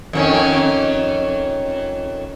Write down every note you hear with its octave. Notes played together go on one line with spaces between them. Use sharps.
F2 D#3 C#4